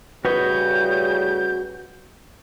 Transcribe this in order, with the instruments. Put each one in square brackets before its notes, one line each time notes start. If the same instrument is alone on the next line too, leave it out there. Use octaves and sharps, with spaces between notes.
[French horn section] A2 C#3 G3 [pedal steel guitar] F#4 C#5 D#5 [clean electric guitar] B4 [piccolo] G6